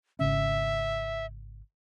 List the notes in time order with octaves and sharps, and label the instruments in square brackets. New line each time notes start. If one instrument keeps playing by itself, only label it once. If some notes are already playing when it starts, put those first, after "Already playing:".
[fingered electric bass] G#1 C#3 C#4 [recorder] E5